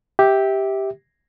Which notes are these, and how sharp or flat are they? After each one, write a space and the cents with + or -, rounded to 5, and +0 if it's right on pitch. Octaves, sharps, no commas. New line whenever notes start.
G4 +0 E5 -20